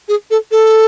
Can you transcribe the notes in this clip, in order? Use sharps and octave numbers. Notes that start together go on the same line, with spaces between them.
G#4
A4
A4